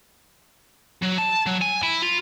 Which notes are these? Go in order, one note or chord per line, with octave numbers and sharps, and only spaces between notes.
F#3
A5
F#3
G#5
E4
F4